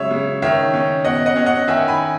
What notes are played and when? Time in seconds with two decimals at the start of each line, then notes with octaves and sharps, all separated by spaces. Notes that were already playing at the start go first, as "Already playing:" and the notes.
Already playing: C#3 F#3 G#3 C#5 E5
0.10 C#3
0.42 D#3 C#5 E5
0.74 C#4
1.05 B2 D#5 F#5
1.26 D#5 F#5
1.36 C#4
1.46 D#5 F#5
1.67 D#3 E5 G#5
1.88 G#5 B5